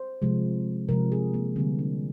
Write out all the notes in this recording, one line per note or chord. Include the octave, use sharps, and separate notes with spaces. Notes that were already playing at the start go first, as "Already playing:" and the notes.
Already playing: C5
C3 F3 G#3
C3 F3 G#3 A#4
G#4
A#3
D3 G3 A#3 C4
D4